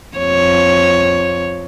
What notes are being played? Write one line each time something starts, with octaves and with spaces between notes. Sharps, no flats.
F2 C#5